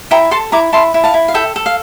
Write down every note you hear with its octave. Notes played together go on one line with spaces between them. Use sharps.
E4 G5 A#5
A4 A5 C6
E4 A#5 D6
E4 A5 C6
E4
F5 A5
E4
F5
A4 E5 G5
A4
F5